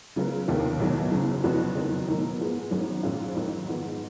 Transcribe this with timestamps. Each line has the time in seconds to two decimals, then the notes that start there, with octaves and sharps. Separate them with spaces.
0.16 C#3 F#3 B3 F4 A#4
0.48 F1 D#2 D#3 A#3 F4
0.80 B1 B2 F#3
1.12 F#1 F#2 C#3 F#3
1.44 F1 F2 F3 B3 F#4
1.75 F#1 F#2 D#3 F#3
2.08 B2 F#3 A#3 D#4 A#4
2.40 G#2 F3 G#3 B3
2.71 G#1 F#2 D#3 F#3
3.03 A#1 G#2 F#3 C#4 F4
3.35 F2 D#3 F#3
3.67 G#2 F3 B3